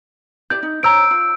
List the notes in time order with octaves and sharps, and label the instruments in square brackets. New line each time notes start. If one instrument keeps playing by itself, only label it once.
[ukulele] E4 G4 D5 [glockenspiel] G6
[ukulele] D#4
[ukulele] C5 C#5 A#5 [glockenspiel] E6 D7
[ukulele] F4